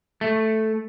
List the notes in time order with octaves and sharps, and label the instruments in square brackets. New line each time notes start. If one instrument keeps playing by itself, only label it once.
[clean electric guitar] A3